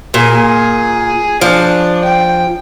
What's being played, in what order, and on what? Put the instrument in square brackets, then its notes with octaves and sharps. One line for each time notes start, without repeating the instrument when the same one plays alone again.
[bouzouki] A#2 [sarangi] G#4
[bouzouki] F3 [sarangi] D4
[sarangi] G5